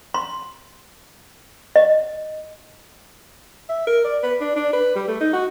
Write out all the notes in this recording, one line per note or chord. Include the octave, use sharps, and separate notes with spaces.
C6
D#5
E5
A#4
D5
B4
D4
D4
B4
G3
A3
D#4
F#4